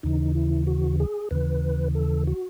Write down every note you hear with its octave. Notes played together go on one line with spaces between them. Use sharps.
D#2 C#3 E3 D#4
E4
F#4
G#4
D#2 C#3 E3 B4
A4
F#4